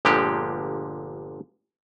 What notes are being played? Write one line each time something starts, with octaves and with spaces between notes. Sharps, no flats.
G1 A#2 D3 F3 G#3 G4